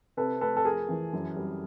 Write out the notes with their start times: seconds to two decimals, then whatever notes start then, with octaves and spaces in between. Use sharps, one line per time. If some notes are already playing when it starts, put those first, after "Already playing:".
0.17 C3 A4 B4
0.41 A3 A4 B4
0.56 A4
0.65 F2 G#4 A#4
0.89 E3
1.13 F#2
1.37 G3